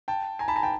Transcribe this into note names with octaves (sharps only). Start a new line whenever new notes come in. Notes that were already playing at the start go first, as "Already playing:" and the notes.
G5 A5
G#5 A#5
A5 B5
G#5 A#5
G5 A5